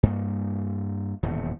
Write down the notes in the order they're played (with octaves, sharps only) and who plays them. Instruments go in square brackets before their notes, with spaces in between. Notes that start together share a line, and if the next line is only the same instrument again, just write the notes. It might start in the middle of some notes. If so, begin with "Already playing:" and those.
[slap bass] G2 A#3
D#1 E2 A2 C3